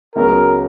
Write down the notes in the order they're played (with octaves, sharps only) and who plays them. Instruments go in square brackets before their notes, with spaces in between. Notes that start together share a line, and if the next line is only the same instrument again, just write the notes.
[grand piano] C#2 C#3 F#3 B3 [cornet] A#4